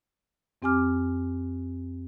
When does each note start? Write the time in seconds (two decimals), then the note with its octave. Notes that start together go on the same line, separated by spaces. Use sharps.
0.62 F2 C4 G4 G#5 D6 F6